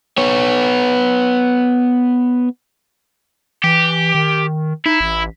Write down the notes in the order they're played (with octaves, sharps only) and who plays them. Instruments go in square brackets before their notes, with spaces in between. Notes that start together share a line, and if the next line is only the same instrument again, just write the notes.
[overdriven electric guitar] B3 C#5
[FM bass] E3 [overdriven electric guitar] G4
[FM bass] D#3
[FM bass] D#4 [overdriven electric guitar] E4
[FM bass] A1